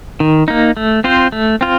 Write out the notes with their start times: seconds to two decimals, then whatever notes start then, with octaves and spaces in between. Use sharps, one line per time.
0.20 D#3
0.48 A#3 D#4
0.77 A3
1.04 C4 F4 C5
1.32 A3
1.61 C4 F4